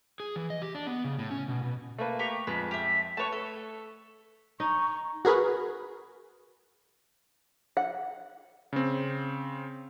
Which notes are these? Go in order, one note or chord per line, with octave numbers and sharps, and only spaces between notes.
G#4
E3
D#5
G4
D4
B3
C#3
A2
C#4
B2
B2
A3 A#3 B4
G4 A#5 C#6
F2 G#3 B4
G4 E5
A3 B4 C#5 A5 C#6
A4
D#4 C#6
F#4 G#4 A#4 B4
F#5
C#3 C4